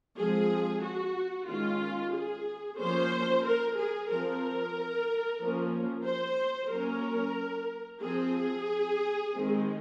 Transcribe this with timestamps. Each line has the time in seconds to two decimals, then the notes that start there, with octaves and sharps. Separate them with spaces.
0.17 F3 G#3 C4 G#4
0.82 F#4
1.48 D#3 G#3 C#4 F4
2.13 G#4
2.79 F3 A#3 C#4 C5
3.45 A#4
3.78 G#4
4.10 F3 C4 A#4
5.40 F3 A#3 C#4
6.06 C5
6.71 F#3 A#3 C#4 A#4
8.02 F3 C4 G#4
9.33 D#3 G#3 C4